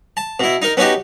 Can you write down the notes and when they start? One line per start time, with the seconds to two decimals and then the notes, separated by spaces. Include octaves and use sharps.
0.17 A5
0.40 B2 E4
0.62 D#4 A#4
0.77 B3 C#4 D#4 F#4 G4